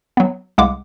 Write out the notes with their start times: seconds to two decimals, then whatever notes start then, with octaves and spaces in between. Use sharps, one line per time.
0.17 F#3 B3
0.58 C2 G#3 F5 F#5 D6